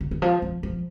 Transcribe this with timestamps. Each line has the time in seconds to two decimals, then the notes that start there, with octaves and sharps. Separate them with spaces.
0.01 C#3
0.11 D#3
0.22 F3
0.42 F3
0.63 F3